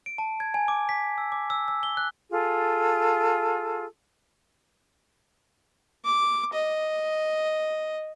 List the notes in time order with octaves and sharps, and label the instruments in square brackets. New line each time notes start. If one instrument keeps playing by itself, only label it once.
[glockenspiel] D7
A5
G#6
G#5
D6
B6
E6
D6
E6
E6
G7
F#6
[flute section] F4 G#4 A4
[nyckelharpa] D6
D#5